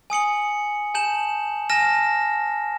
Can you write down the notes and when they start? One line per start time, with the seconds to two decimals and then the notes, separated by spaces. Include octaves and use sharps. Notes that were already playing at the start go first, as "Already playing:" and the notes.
0.10 G#5 D#6 C#7 F#7
0.94 G#5 A5 G6 E7 F#7
1.70 G#5 A5 F6 A#6 E7